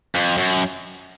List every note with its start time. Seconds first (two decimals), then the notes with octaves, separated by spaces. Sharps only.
0.15 F2
0.38 F#2